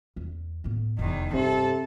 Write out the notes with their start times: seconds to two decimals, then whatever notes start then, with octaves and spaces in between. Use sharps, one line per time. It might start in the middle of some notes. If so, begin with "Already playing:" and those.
0.16 E2
0.64 A2 B3
0.99 F1 E2 D#3
1.33 G2 C3 A4